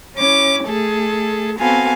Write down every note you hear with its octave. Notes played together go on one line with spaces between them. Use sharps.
C#4 E4 D6
A3 G#4 A4
B3 C4 F#4 A4 F5 G#5